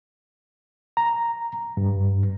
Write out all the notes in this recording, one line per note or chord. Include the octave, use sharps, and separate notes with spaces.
A#5
G2